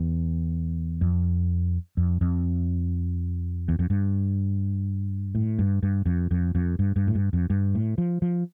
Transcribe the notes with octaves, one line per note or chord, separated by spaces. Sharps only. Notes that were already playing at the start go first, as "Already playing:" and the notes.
Already playing: E2
F2
F2
F2
E2
F2
G2
A2
G2
G2
F2
F2
F2
G2
G2
A2
G2
F2
G2
A2
F3
F3